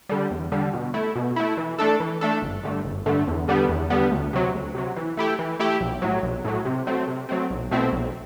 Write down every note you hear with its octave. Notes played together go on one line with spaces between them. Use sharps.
D3 G3
E2
D3 G3
B2
A3 E4
B2
A3 E4
E3
A3 D4 A4
E3
A3 D4 A4
G1
G2 D3 A3
G1
G2 D3 A3
E2
D3 G3 B3
E2
D3 G3 B3
D2
C3 F#3
D2
C3 F#3
E3
A3 E4 G4
E3
A3 E4 G4
B1
A2 F#3
B1
A2 F#3
C3
F#3 A3 C4
C3
F#3 A3 C4
B1
B2 A3 C4 E4
B1